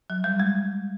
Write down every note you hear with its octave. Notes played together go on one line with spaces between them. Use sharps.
F#3
G3
G#3